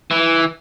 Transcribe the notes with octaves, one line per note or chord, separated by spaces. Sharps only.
E3